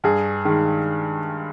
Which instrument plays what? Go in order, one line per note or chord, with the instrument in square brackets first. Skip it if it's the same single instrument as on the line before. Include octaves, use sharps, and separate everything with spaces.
[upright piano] G2 G#4
D#3 G#3